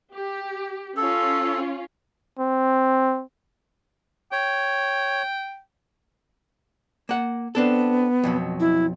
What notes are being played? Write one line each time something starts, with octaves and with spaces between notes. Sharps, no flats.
G4
C#4 F4 A4
C4
C#5 G5
A#3 F#5
B3 C4 D4 A4
F2 B2 F#3
E4